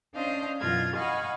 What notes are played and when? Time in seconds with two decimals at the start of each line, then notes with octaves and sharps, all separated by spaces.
0.13 C#4 D4 C5 D#5 F5 G6
0.61 F#2 B2 E3 F4 G#6 A#6
0.96 D#5 F5 F#5 G#5 B5 C#6